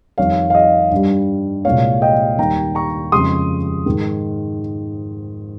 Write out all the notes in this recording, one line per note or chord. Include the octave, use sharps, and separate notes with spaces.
F2 D#3 G3 C#5 F5
F5
D#5
G2 G3
C2 A#2 G#3 C#5 F5
D#5 G5
D#2 D#3 G3 G5 A#5
A#5 C#6
F2 C#3 G#3 C6 D#6
G#2 D#3 G#3